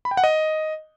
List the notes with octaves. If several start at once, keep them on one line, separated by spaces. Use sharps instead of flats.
B5
G5
F#5
D#5